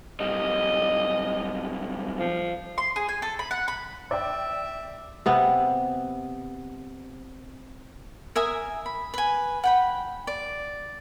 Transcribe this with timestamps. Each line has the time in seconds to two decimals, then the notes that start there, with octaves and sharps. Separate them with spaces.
0.20 B1 G3 D#5
2.20 F3
2.78 C6
2.96 G#4
3.09 G#5
3.22 A4
3.39 B5
3.51 F#5
3.68 B5
4.11 D5 E5 G5
5.26 C3 B3
8.36 A#4 E5 G#5 D#6
8.86 B5
9.14 B4 G#5
9.64 F#5 G5 B5
10.27 D5